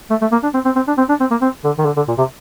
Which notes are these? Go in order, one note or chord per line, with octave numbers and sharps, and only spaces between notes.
A3
A3
A#3
D4
C4
C4
C4
D4
C4
D4
C4
A#3
C4
D3
D#3
D3
D3
A#2
C3